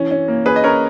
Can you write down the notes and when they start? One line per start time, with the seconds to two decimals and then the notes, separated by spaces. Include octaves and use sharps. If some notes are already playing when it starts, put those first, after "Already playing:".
Already playing: E3 C#4
0.11 C#4
0.28 A#3
0.45 C#4 G#4 B4
0.56 D#5
0.63 C#4 A#4 C#5